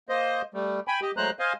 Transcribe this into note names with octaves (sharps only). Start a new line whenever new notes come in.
A#3 C5 D#5
G3 A3
G5 G#5 B5
G4 D#5
F#3 G#3 A3 C5 A#5 F#6
C5 D#5 F5 G#5